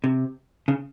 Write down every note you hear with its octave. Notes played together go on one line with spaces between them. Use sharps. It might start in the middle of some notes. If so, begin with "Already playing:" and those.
C3
C#3